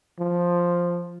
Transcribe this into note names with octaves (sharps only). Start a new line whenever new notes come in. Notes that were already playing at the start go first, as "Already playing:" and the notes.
F3